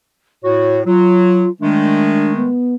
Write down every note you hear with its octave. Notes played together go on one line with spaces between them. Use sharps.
A2 F#4 C#5
F#3 F4
D#3 G#3 A3 D4
B3